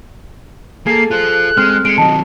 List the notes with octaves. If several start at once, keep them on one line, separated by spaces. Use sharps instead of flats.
A#3 G#4 A4 C7
F4 C5 F#6
G#3 C4 F6
G#3 C#7 D7
D#3 F#3 D#5 A5